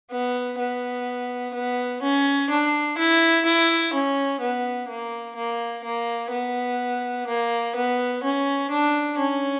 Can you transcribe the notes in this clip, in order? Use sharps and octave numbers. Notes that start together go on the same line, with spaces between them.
B3
B3
B3
C#4
D4
E4
E4
C#4
B3
A#3
A#3
A#3
B3
A#3
B3
C#4
D4
C#4